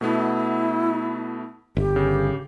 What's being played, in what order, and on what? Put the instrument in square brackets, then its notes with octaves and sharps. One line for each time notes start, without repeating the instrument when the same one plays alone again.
[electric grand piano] B2 A3 B3 [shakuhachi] E4
[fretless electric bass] G1 [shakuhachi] G4
[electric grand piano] C#3